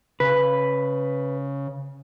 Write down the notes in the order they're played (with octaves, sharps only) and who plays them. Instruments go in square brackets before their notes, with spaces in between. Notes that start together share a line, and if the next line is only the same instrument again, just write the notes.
[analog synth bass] C#3 [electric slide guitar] B4